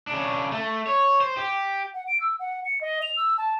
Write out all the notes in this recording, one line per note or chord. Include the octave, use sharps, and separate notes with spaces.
C#3 D4
A3
C#5
C5
G4
F#5
D7
E6
F#5
C#7
D#5
F7
E6
A5